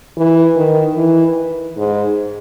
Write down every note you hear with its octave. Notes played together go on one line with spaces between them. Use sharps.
E3
D#3
E3
G#2